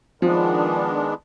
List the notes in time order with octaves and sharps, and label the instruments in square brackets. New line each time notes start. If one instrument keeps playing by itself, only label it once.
[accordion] D#3 G#3 B3 D4 [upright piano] F3